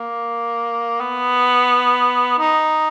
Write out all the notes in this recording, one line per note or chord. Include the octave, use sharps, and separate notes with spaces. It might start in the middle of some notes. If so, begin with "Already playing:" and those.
Already playing: A#3
B3
D#4